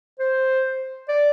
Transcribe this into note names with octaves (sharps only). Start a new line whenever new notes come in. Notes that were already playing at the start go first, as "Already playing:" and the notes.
C5
D5